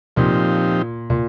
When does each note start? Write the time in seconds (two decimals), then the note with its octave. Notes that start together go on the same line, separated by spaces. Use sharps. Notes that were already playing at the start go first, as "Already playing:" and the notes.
0.17 A#2 F3 C4 D#4 G4
1.10 A#2